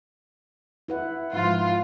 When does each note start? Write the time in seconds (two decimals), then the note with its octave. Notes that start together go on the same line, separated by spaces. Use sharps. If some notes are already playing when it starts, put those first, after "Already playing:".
0.88 E4 B4 F#5
1.33 G#2 F3 F4